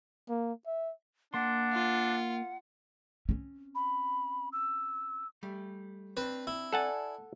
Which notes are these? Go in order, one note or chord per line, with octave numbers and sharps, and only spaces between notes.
A#3
E5
A#3 D4 F#5 C6
F4
C4 C#4
B5
E6
G3 A3
C4 D4 B4
E4
A4 D5 F#5 G#5 A5